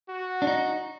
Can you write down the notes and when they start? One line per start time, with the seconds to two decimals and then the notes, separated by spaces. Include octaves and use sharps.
0.09 F#4
0.42 D4
0.47 D#4